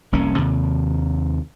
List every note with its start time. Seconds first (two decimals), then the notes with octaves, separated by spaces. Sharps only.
0.12 F1 C2 A#3 C#4
0.38 D#2 C3